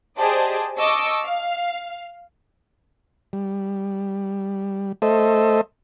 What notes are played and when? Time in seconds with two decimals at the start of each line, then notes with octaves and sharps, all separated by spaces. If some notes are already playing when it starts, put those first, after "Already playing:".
0.18 G4 G#4 C5 D5 D#5 A5
0.78 D#5 A5 C#6 D6 E6
1.23 F5
3.33 G3
5.02 A3 A4 C5 D#5 E5